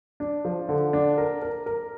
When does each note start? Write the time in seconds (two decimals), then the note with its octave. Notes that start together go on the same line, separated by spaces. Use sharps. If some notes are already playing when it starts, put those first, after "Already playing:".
0.20 D4
0.45 F3
0.69 D3
0.93 D4
1.18 A#4
1.42 A#4
1.66 A#4